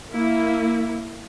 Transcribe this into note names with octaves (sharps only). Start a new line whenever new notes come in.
A#3 E4